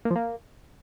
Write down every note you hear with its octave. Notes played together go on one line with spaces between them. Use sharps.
A#3
F3
A#3